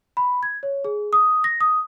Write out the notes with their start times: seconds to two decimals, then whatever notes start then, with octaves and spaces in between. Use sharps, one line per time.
0.17 B5
0.43 G#6
0.63 C#5
0.85 G#4
1.13 D#6
1.44 A#6
1.61 D#6